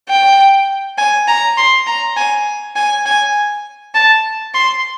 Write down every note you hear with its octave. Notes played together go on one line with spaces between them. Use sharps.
G5
G#5
A#5
C6
A#5
G#5
G#5
G#5
A5
C6